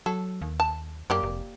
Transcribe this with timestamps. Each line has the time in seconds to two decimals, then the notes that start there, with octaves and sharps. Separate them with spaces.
0.06 F#3 A4
0.41 D#2
0.60 A5
1.10 F#2 A#3 G4 D5
1.23 F1